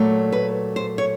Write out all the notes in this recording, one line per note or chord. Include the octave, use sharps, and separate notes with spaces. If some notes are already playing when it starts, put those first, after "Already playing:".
Already playing: A#2 F#3 A3
B4
C5
C#5